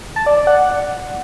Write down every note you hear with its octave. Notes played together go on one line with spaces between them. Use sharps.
A5
D5
D5
F#5